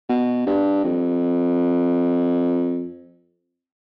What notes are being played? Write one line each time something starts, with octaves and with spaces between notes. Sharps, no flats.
B2
G2
F2